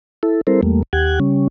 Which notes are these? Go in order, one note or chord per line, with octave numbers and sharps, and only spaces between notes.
E4 A4
G3 C4 E4 A4 A#4 C5
E2 G3 A3 A#3
D#2 G4 F#5 G5 F#6 G#6
C#3 G3 C#4